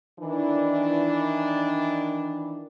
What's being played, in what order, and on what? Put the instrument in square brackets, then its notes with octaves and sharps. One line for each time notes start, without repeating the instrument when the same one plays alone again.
[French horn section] D#3 E3 D4